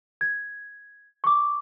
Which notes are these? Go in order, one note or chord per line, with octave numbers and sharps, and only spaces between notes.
G#6
C#6 D6